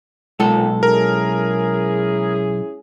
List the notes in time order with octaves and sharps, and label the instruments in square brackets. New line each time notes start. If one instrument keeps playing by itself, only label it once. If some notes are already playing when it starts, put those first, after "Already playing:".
[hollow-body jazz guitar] B1 A4 [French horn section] A#2 [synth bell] G#3
[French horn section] C#4 E4 G#4 [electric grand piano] A#4